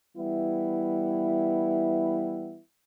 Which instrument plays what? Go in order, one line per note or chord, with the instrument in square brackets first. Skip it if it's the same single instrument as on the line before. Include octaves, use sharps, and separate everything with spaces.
[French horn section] E3 G3 B3 E4